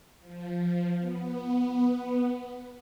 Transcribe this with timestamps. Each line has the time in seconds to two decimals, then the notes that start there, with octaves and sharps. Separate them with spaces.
0.20 F3
0.99 B3